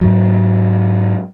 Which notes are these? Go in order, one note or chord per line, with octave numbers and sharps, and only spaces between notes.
G#2 F#3